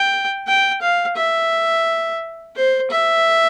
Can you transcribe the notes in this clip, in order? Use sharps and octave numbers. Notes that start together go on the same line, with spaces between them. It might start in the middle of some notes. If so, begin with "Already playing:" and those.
Already playing: G5
G5
F5
E5
C5
E5